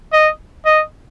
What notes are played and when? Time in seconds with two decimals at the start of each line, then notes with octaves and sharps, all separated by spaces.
0.13 D#5
0.65 D#5